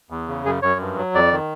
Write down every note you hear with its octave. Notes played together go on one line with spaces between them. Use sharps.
E2
C#3
F#2 G#4
F#2 C#5
G2
F#3
F2 D5
D#3